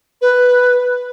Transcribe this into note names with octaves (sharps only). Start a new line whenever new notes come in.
B4